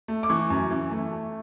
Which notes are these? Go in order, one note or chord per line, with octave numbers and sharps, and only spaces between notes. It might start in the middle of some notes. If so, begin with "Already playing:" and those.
A3
D6
E3 C#6
F#2
E3
A3
A3